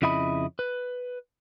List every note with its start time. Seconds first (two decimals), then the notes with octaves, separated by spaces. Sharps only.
0.02 F2 C#3 E4 D#5 B5
0.59 B4